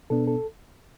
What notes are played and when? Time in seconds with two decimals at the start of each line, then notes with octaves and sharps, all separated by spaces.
0.10 B2 B3 D4 A4
0.27 A4